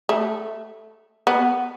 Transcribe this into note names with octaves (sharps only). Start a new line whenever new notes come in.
A3
B3